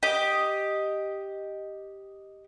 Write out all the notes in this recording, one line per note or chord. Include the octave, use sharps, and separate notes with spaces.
G4 D#5